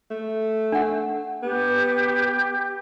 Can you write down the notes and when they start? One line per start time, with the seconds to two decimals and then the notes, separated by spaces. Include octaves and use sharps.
0.10 A3
0.72 D4 F#5
1.43 B3 G4